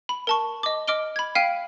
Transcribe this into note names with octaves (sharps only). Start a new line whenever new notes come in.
B5
A#4 A5 C#6
D#5 D6
D#5 D6 F6 D7 G7
B5 G#6
F5 G5 F6 B6 C7 D#7